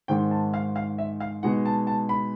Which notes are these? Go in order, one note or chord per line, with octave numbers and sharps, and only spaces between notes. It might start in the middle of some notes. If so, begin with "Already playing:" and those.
G#2 D#3 G#3 C4 G5
A5
F5
F5
E5
F5
B2 G#3 B3 D#4 F#5
A5
A5
B5